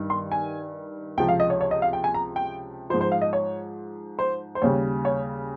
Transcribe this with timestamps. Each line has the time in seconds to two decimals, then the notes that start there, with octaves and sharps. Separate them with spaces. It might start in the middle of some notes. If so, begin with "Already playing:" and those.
Already playing: G2 D#3 G3
0.10 C6
0.32 G#5
1.17 C#2 C3 F3 G5
1.29 F5
1.40 D#5
1.50 C#5
1.61 C#5
1.71 D#5
1.82 F5
1.93 G5
2.04 G#5
2.14 A#5
2.36 G5
2.90 F3 C5
2.94 G#2
3.01 C5
3.12 F5
3.22 D#5
3.33 C#5
4.19 C5
4.55 C5
4.62 D#2 C#3 G3 C#5
5.05 C#5